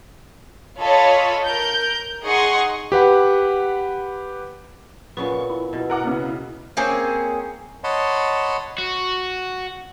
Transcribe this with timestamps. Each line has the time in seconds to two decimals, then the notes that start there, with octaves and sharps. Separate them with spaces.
0.78 F4 A4 C#5 D#5 B5
1.44 A#4 G6
2.23 D#4 G#4 D#5 F#5 C6 C#6
2.92 G4 B4 F#5 B5
5.17 A#2 C#3 B3 C#6
5.50 E4
5.73 B2
5.90 A#4 F#5 D6
6.04 C#3 B3
6.77 A#3 C4 C#4 G#4
7.84 C#5 D#5 F#5 A5 B5 C6
8.78 F#4